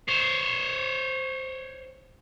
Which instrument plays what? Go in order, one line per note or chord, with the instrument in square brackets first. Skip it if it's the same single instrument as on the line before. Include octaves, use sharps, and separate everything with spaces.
[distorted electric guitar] C5 C#5